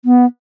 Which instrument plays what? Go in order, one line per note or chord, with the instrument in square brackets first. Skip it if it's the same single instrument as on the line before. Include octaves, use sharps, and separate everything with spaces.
[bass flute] B3